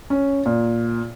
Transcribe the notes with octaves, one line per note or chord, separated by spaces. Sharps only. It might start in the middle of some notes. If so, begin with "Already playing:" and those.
C#4
A#2